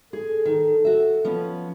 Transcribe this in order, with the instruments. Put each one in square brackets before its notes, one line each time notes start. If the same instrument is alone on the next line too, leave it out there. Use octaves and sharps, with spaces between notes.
[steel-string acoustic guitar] G#4 [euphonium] A4
[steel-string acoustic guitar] D#3
F#4 E5
F3 B3 C#4